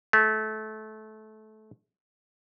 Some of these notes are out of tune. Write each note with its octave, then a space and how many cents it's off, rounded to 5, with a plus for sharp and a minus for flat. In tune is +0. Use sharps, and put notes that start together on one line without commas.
A3 -20